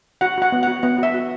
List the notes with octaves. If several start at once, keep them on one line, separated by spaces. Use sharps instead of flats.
F#4 F#5
F#4 F#5
B3
F#4 F#5
B3 F#5
F#4 E5
F#4